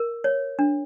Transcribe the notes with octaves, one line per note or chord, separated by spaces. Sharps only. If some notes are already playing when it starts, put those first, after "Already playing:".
Already playing: A#4
C#5
D4